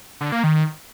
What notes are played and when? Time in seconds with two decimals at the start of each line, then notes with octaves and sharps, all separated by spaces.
0.21 D3
0.32 A#3
0.44 D#3